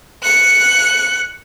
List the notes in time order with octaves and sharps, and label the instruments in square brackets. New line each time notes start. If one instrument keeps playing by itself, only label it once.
[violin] F#6 C#7